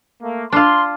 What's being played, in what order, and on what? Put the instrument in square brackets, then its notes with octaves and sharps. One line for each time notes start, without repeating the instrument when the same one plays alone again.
[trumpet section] A3 A#3
[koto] D4 F4 [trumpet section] C6